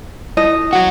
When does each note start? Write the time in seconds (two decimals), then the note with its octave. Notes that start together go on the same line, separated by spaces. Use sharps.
0.37 E4 D#5
0.73 F#3 F#4